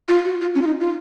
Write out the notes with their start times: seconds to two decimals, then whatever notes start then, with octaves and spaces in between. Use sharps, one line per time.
0.08 F4
0.25 F#4
0.41 F4
0.55 C#4
0.62 F4
0.67 D#4
0.80 F4